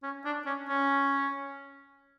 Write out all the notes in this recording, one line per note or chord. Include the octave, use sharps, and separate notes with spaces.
C#4
D4
C#4
C#4